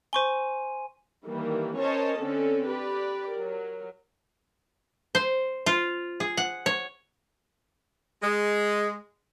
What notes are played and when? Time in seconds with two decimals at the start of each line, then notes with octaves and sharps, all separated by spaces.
0.13 C5 G#5 C6 C#6 D#7 G7
1.25 D#3 E3 G3 A#3
1.77 C#4 A#4 C5 C#5 D#5 A5
2.18 D3 C4 C#4 A4
2.65 G4 B4 D5
3.33 F#3 A#4
5.15 C5
5.66 F4
6.20 G#4
6.37 F#5
6.66 C#5
8.22 G#3